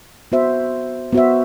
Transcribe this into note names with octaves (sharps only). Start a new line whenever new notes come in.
B3 F#4 C5 E5
B3 F#4 C5 E5